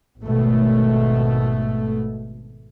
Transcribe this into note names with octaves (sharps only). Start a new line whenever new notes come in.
G#1 B2 A3